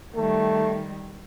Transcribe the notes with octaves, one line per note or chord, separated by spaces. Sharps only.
D#3 G3 A3